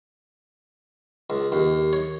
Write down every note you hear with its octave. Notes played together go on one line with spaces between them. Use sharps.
C#2
D#2
C#5